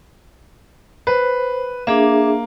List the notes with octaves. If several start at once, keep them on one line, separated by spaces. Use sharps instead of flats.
B4 C5
A#3 D4 G#4 E5